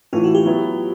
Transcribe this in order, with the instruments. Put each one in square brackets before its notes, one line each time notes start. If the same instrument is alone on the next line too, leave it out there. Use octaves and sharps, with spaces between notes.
[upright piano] A2 E3 A3 [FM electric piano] D#4 F4
[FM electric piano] E4 F#4
F4 G4
[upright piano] F#3 B3 E4